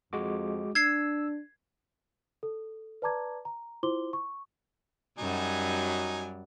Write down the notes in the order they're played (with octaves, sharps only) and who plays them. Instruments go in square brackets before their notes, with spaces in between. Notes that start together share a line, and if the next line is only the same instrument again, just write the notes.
[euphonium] F2 [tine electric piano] G#3 F#4 D6
[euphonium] D4 [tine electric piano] E6 [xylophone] G#6 C7
[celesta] A4
B4 D5 A5 A#5 D6 G#6
A#5
E4 F4 C5 C6 D6 G7
C#6
[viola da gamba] F#2 G3 [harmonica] F#3 D#4 G#5